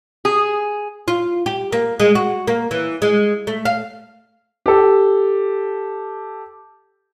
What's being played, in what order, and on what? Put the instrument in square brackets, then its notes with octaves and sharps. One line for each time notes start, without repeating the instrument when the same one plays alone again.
[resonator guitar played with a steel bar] G#4
[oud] F4
G4
A#3
G#3
F#4
A#3
E3
G#3
A3
F5
[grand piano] G4 A4